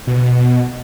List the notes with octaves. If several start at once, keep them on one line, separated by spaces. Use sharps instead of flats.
B2